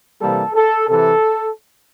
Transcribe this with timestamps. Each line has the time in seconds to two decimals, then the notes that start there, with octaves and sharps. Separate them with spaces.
0.20 C3 E3 G3 A#3 A4
0.55 A4
0.88 C3 E3 A4